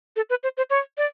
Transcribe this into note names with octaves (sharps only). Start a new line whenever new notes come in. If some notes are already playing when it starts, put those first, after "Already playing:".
A4
B4
C5
C5
C#5
D5